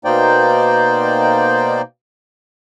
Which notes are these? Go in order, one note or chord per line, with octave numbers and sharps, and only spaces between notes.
B2 A#3 D#4 C5 D5 G5